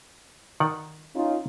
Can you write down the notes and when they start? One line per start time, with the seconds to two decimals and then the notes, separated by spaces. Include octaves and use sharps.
0.60 D#3 D5 F#5
1.15 C#4 D#4 F4